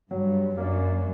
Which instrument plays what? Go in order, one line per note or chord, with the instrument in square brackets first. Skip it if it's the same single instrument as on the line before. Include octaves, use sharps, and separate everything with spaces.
[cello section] G2 [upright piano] F#3
[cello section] F#2 [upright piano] A#3 D4